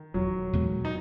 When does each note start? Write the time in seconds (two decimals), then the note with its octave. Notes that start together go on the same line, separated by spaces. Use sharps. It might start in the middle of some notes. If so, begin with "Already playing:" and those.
Already playing: D#3
0.14 E1 F#3
0.53 E2 B2 G#3
0.85 D#4